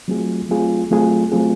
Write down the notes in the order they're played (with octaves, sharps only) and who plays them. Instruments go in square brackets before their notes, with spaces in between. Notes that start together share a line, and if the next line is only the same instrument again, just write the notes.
[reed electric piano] F#3 A3 C4 F4 G#4
F#3 A3 C4 F4 G#4
F#3 A3 C4 F4 G#4
F#3 A3 C4 F4 G#4